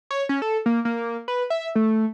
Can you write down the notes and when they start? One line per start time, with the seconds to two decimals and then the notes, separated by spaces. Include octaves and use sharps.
0.11 C#5
0.29 C#4
0.42 A4
0.66 A#3
0.85 A#3
1.28 B4
1.50 E5
1.76 A3